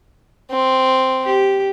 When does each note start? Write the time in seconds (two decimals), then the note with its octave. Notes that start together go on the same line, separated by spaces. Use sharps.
0.51 C4
1.24 G4